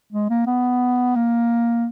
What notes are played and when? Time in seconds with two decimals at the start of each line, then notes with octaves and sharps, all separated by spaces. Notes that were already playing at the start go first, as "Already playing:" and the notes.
0.13 G#3
0.30 A#3
0.47 B3
1.16 A#3